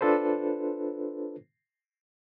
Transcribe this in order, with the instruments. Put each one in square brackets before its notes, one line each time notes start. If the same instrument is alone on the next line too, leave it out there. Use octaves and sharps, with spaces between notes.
[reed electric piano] D4 F4 A4 B4 C5